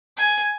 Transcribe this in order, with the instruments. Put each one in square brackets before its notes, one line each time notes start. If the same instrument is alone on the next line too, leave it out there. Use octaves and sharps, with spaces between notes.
[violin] G#5